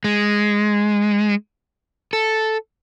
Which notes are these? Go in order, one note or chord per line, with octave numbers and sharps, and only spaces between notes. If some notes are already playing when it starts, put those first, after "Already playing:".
G#3
A4